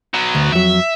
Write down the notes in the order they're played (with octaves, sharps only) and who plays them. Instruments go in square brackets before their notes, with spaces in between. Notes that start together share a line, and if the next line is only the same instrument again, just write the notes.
[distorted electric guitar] F#3 B3
[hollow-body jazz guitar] D2
[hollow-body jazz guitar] F2 F#3 [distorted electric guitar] E5